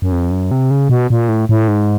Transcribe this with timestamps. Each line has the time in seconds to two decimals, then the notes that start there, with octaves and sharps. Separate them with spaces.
0.02 F#2
0.12 F2
0.31 F#2
0.51 C3
0.71 C#3
0.89 B2
1.10 A#2
1.29 A2
1.49 A2
1.68 G#2